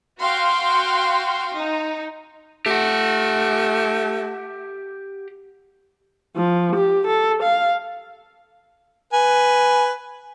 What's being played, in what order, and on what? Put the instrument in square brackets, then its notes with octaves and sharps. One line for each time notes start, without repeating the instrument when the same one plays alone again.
[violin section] F#4 F5 G5 C6
D#4
[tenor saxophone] A3 [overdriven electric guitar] G4 F#5
[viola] F3
G4
A4
F5
[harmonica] B4 G#5